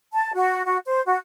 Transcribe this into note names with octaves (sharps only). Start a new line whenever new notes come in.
A5
F#4
F#4
C5
F#4